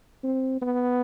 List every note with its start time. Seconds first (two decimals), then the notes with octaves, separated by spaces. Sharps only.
0.23 C4
0.61 B3